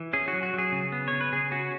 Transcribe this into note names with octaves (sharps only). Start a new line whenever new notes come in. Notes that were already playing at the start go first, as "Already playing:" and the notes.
Already playing: E3
C#4 G#4
F#4
F#3
F#4
F#3 G#4
C#3
B3
C#3 C#5
B4
C#3 G#4
C#4 F#4